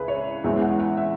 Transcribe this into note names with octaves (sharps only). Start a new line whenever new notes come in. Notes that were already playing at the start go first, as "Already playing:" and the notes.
Already playing: C#2 C#3 E4 G#4 B4
C#5
E2 E3 G#3 E5
F#5
F#5
E5